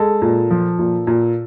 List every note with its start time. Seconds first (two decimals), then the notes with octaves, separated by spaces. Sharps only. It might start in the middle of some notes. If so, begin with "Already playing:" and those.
Already playing: G#3 A4
0.22 A#2
0.51 F3
0.79 A#2
1.07 A#2